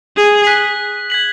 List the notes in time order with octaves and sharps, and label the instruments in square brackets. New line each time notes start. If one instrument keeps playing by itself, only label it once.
[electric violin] G#4
[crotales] F#6 B6 F#7
G#6 B6 F#7